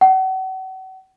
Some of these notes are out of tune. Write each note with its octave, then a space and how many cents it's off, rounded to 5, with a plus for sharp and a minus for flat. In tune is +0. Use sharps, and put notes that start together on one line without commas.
F#5 +40